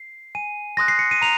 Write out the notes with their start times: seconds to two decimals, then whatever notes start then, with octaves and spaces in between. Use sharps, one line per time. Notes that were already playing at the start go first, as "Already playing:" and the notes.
Already playing: C7
0.35 G#5 D#7
0.77 C6 D#6 F#6 A#6
0.88 C7
0.99 C#7
1.11 D#7
1.22 A#5 F7